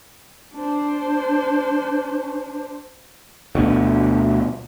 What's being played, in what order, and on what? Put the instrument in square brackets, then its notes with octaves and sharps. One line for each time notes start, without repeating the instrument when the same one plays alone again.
[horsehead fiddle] D4 C5
[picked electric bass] D2 B2